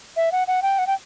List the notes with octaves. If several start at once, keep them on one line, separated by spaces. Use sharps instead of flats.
E5
F#5
F#5
G5
F#5
G5